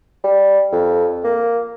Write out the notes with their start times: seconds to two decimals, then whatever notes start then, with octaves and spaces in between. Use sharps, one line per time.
0.24 G3
0.73 F2
1.24 A#3